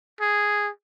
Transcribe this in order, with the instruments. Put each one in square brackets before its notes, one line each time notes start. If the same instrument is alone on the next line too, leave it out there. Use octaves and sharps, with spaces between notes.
[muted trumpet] G#4